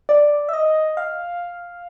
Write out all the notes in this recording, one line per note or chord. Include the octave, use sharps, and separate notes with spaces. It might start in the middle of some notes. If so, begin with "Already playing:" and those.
D5
E5
D#5
F5